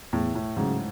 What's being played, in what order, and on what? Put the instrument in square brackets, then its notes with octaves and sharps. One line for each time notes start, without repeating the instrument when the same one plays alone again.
[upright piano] E2 [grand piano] A2
[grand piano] A2
[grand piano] G#2 [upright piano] C#3 F#3